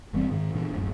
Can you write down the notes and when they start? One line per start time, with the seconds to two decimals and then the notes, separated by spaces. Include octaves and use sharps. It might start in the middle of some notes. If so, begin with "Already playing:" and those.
0.13 F#1 E3 G3 C4
0.31 G#2 D#3
0.55 A#2 E3 D4
0.73 D1 F#2